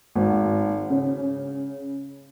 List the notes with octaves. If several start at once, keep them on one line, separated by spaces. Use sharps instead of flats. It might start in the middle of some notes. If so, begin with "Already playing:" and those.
G#1
C#3